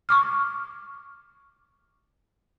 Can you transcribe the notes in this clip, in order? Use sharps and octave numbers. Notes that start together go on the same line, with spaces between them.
C#6 D6 F6